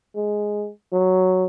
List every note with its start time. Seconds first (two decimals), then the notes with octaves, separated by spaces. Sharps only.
0.16 G#3
0.93 F#3